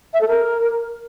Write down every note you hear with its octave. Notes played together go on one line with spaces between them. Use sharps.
E5
A4
A#4